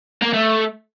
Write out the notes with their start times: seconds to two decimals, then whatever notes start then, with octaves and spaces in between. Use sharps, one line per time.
0.22 A#3
0.33 A3